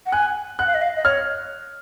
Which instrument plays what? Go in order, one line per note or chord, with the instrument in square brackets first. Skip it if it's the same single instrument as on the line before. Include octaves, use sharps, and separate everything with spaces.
[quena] F#5
[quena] G#5 [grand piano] F#6
[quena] F#5 [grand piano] F#6
[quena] F5
D#5
F5
D#5
[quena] C#5 [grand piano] F6